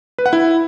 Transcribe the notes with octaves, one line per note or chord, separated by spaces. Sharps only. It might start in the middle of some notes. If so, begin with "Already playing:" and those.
B4
F#5
E4